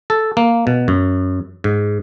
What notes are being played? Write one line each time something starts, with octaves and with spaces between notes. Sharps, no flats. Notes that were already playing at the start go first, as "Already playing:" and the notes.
A4
A#3
B2
F#2
G#2